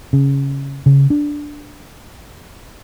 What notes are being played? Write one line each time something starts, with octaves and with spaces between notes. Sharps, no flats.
C#3
C#3
D4